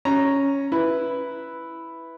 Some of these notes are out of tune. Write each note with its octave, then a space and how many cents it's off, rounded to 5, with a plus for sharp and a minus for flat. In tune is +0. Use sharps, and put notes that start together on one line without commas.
C#4 +0 A#5 +0
E4 +0 B4 +0